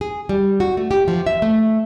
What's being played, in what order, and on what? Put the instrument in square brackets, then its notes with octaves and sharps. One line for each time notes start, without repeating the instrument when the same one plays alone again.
[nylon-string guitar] G#4
G3
F#4
A3
G4
F3
E5
A3